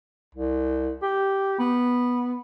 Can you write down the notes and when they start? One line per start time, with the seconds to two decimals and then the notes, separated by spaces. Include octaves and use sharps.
0.35 C2
1.02 G4
1.59 B3